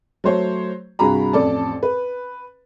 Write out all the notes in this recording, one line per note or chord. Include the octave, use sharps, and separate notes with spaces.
F#3 A3 C5 C#5
C2 G2 F#4 G#4 A#5 B5
A1 F2 A4 D5 A5
B4